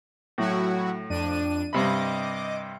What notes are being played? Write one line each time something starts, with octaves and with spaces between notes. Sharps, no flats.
A2 F#3 E4 F#4
F2 D4 D#7
G2 C3 D#5 B5 D6